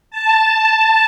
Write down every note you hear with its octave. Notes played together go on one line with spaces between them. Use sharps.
A5